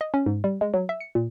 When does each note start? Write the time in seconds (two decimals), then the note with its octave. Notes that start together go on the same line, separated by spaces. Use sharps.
0.01 D#5
0.14 C#4
0.26 G#2
0.44 G3
0.61 G#3
0.74 F#3
0.89 E5
1.00 C#7
1.15 A#2